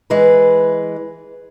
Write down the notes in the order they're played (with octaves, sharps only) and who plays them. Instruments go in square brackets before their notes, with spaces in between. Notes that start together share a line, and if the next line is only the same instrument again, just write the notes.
[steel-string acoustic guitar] E3 G#3 B4